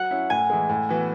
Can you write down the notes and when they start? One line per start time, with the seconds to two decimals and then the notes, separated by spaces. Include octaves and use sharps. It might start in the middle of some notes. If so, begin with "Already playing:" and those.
Already playing: F#3 F#5
0.11 C#4 E4
0.30 A2 G#5
0.50 E3 G#3
0.69 A2
0.89 E3 B3 F#4